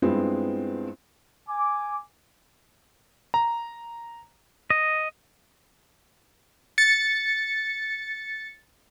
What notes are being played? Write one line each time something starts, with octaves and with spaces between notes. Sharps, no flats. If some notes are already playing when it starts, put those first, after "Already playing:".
G2 G#3 B3 C4 E4 F4
G#5 D6
A#5
D#5
A6 C#7